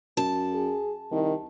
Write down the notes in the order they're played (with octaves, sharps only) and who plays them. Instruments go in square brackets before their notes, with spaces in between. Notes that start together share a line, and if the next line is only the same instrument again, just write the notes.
[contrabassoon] F#2 [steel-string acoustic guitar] A5
[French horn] G#4
[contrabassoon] C2 [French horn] D#3